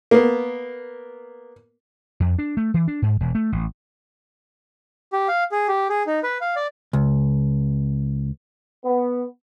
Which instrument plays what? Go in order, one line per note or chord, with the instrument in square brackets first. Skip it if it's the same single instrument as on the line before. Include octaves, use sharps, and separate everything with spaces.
[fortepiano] A#3 B3
[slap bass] F2
D4
A3
E3
D4
G#2
E1
A3
A1
[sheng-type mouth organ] G4
F5
G#4
G4
G#4
D#4
B4
F5
D5
[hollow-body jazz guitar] C#2
[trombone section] B3